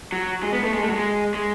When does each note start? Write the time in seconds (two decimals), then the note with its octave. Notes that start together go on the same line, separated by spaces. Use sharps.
0.12 F#3
0.43 G#3
0.53 B3
0.63 A3
0.73 G#3
0.84 A3
0.89 F#3
0.94 G#3
1.34 G#3